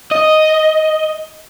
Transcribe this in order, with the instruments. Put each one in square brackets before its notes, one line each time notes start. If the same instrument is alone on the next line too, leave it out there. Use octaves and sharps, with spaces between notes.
[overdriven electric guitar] D#5